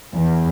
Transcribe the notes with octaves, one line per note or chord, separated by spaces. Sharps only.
E2